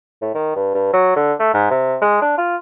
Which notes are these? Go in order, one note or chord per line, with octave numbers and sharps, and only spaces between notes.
A2
D#3
G2
G2
F#3
D3
A3
G#2
C3
G#3
D4
F4